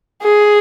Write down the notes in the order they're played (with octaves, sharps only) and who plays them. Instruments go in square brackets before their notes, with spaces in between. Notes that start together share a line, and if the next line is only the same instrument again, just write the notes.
[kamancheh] G#4